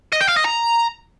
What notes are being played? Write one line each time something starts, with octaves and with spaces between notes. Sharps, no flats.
D#5
G5
F5
D#5
A#5